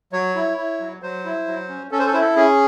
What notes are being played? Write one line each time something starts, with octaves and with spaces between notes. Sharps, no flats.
F#3 C#5
E4
E4
F#3
F#3 C5
E4
F#3
C#4
C#4 A4
C5
A4
E4 C5
A4
C#4 G#4